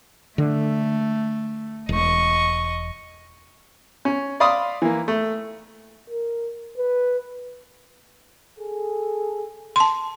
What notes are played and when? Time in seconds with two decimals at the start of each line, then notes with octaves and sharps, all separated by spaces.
0.38 D3 A3
1.89 E1 D#5 C#6
4.05 C#4
4.40 D5 F5 B5 C6 D6 D#6
4.82 E3 A#3
5.08 A3
6.10 A#4
6.78 B4
8.58 G#4 A4
9.76 A5 C6